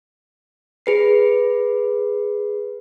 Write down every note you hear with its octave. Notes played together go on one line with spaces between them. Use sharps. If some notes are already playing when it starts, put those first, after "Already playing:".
G#4 B4 C7